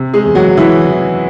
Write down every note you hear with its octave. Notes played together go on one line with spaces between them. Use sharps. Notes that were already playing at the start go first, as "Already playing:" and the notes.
Already playing: C3
G#3 G#4
E2
F#3 F#4
E3 E4
E3